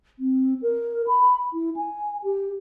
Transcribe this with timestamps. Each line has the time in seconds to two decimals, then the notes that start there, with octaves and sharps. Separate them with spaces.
0.19 C4
0.62 A#4
1.08 B5
1.53 E4
1.76 G#5
2.24 G4